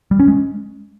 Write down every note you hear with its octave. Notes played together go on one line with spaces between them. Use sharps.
G3
C#4
G#3